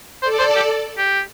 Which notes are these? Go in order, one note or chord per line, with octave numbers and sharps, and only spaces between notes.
A4 C5 D5
C5
G4
G4